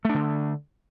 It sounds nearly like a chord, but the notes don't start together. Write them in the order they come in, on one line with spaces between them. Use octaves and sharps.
A3 D4 D3